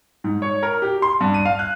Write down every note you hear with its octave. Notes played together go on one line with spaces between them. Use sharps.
G#2
C#5
A#4
G4
C6
G2
D#7
F5
F#6